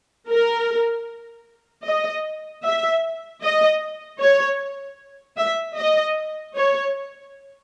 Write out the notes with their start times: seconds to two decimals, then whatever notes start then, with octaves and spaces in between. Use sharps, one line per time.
0.29 A#4
1.86 D#5
2.64 E5
3.42 D#5
4.20 C#5
5.37 E5
5.77 D#5
6.55 C#5